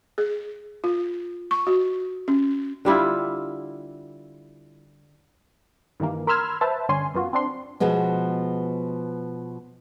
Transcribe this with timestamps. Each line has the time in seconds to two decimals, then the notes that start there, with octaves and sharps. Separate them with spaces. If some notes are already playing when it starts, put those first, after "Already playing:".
0.18 G#4
0.84 F4
1.51 C#6
1.67 F#4
2.28 C#4
2.85 D3 G3 E4 F4
6.00 G2 D#3 E3 A#3
6.27 A#4 B5 C6 E6 F6 G#6
6.61 B4 C5 E5 A5
6.89 G2 D3 C#4 G#5 C6
7.14 F#2 B3 F4 F#4
7.33 C4 D4 C6
7.80 B2 F3 G#3 B3